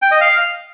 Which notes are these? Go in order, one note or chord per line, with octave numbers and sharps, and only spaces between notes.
G5
D#5
F5